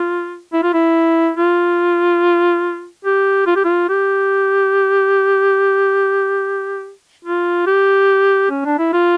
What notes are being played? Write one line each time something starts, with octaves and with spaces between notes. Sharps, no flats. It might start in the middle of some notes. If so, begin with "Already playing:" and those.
Already playing: F4
E4
F4
E4
F4
G4
F4
G4
F4
G4
F4
G4
C#4
D4
E4
F4